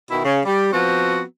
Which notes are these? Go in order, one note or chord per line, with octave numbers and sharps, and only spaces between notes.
B2 D#3 E4
C#3
G3
F3 B3 C4 F#4